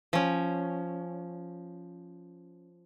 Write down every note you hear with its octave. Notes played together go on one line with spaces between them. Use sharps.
F3 C#4